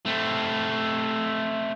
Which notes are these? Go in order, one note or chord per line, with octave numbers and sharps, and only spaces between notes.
A3 C4